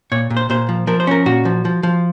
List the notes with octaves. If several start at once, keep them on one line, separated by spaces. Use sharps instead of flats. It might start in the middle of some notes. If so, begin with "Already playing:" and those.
A#2 C#5
A#2
C5
A#2 C5
F3
F3 A#4
C5
C#4 A#4
A#2 F#4
F3
F3
F3